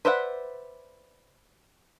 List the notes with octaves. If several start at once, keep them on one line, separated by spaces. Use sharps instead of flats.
B4 C5 D5 E5 F#5